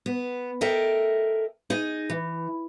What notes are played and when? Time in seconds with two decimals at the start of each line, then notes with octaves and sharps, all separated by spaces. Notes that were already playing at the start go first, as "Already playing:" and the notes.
0.06 B3
0.61 A4 A#4 D#5 E5 G5
1.70 D#4 G#4 D#5
2.10 E3